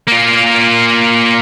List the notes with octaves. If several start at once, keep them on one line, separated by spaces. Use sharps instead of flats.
A#3 F4